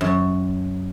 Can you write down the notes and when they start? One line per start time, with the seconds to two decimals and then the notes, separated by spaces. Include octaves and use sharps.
0.01 F#2